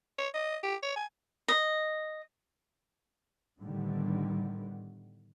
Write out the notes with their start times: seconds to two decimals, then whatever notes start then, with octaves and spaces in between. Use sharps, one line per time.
0.18 C#5
0.34 D#5
0.63 G4
0.83 C#5
0.96 G#5
1.48 D#5
3.60 A2 D3 D#3 G3 B3